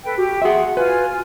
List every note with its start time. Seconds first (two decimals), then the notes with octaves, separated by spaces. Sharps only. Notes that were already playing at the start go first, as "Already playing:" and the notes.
0.04 A4 B4 G5
0.17 F#4 G4
0.42 F#4 G#4 E5 F#5 C6
0.77 F4 B4 G#5